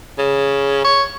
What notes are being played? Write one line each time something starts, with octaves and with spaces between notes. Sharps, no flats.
C#3
C#5